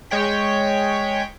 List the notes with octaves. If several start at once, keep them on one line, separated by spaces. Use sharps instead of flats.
G#3 C#5 G5 B6